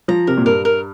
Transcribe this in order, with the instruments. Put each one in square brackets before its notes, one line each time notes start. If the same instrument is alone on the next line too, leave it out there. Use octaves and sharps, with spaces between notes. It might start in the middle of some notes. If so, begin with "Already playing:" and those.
[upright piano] F3 [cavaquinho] A#5
[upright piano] C3 [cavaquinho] A#4
[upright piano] A#2
[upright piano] G2 [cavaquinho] A#4
[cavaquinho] A#4